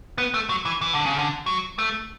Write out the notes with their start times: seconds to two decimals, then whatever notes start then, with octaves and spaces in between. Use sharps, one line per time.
0.18 B3
0.34 A3
0.49 F#3
0.65 E3
0.81 E3
0.94 D3
1.06 C#3
1.18 D3
1.46 F#3
1.79 A3